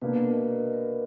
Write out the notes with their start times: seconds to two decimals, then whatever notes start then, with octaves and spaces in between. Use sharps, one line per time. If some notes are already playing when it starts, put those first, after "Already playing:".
0.02 B2 A#3 D4 B4
0.18 A#4
0.33 D#5
0.49 D5
0.73 A#4